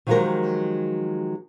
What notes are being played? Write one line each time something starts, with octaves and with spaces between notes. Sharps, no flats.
D#3 F3 F#3 G#3 G4 A#4